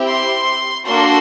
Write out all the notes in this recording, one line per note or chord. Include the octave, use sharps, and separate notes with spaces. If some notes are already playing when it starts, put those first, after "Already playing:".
Already playing: C4 E4 G4
C6
A#3 D4 F#4 A4 C6